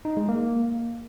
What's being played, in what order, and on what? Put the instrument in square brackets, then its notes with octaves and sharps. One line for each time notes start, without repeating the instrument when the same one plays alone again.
[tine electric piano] D#4
G#3
A#3